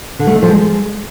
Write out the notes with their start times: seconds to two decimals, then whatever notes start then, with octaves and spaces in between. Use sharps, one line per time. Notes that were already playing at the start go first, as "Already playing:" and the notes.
0.19 D3
0.27 A3
0.35 D#4
0.42 F3
0.50 G#3